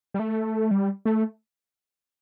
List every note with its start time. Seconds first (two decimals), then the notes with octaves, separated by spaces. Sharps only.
0.14 G3
0.19 A3
0.71 G3
1.05 A3